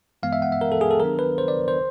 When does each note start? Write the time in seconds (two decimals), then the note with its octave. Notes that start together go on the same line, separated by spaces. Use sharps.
0.23 G2 E3 G#3 B3 F5
0.33 E5
0.42 F#5
0.52 E5
0.61 A#4
0.72 A4
0.81 G#4
0.91 A4
1.00 D#3 F#3 B3 D4 A#4
1.19 B4
1.38 C5
1.48 D5
1.68 C5